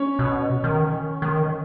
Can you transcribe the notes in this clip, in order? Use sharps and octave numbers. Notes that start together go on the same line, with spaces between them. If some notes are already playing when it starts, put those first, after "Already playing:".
Already playing: C#4 C#5
B2
D#3
D#3